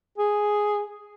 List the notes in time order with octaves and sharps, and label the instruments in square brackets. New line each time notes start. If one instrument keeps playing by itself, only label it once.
[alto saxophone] G#4